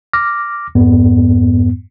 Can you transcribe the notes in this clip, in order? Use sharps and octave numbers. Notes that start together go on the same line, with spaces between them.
D6 F6 A#6
F2 G#2 B3